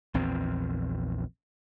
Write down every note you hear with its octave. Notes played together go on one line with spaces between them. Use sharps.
A#1 E2 C4